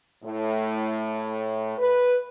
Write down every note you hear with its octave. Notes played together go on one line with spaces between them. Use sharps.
A2
B4